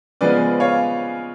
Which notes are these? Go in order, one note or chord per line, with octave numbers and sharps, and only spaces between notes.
C#3 F3 G#3 B3 B4 D5
C#5 F5